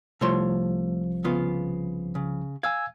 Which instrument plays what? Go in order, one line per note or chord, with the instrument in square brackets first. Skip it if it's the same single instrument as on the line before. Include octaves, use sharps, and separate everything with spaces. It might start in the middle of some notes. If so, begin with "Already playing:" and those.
[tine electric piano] C2 F3 [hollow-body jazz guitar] A3 C#5 C6
[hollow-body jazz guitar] C#3 B3 F4
C#3
[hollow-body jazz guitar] F5 [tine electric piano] G#5 E6 G#6